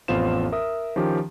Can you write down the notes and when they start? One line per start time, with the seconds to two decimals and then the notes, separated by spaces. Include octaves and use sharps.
0.08 A1 F2 B3 F4 C5 E7
0.52 A#4 E5 D#6
0.96 D#3 F3 C#4 G4